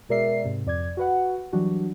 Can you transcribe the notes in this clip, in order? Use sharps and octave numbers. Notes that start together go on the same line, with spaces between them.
B2 G#3 A#4 D5 E5 C7
G#2 C3
F2 D5 G#6
F#4 B4 F#5
E3 F#3 G3 D4 F#4